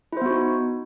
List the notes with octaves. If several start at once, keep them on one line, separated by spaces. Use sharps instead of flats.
B3 D#4 E4 F#4 C5